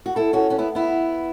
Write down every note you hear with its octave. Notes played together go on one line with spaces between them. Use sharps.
F#4
E4 A4
C#4 F#4
C#4 F#4
B3 E4
B3 E4